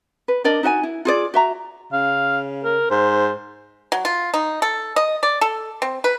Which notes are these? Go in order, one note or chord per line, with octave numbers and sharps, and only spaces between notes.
B4
D4 A#4 D5 D#5
D#4 F#4 D#5 G#5
E4
F4 G#4 D5
F#4 E5 A#5
C#3 F5
A#4
G#2 C5
F#3
F4
D#4
A4
D#5
D5
A4
C4
B4